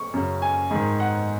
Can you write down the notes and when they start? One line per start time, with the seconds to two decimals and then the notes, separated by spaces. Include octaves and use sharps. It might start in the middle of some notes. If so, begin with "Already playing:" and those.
Already playing: C#6
0.14 F#2 C#3
0.42 G#5
0.71 G#2 D#3
1.00 F#5